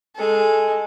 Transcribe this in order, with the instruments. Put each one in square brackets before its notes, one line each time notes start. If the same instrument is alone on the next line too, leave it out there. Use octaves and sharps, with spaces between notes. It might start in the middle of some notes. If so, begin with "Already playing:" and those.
[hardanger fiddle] G#3 A4